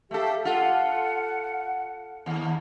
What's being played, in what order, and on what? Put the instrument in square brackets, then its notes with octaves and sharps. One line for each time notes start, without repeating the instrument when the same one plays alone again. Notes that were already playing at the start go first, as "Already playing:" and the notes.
[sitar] A3 A4 [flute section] G4 E5 F5
[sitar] F4 A4 [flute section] F#5
[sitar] D#2